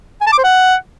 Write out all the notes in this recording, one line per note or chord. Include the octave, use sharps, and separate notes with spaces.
G#5
A5
D6
C5
F#5